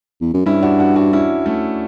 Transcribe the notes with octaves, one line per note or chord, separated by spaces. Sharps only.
E2
F#2
G2 C#4 E4
D4 F#4
D4 F#4
D4 F#4
C#4 E4
A3 C#4